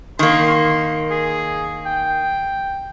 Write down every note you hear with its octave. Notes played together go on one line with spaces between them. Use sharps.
D#3 A#3 C6
G#4
G5